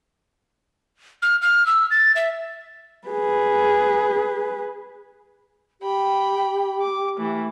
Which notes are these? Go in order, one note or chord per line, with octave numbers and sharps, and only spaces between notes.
F6
F6
E6
A6
E5
G#4 B4
G4 G5 B5
D6
E3 A3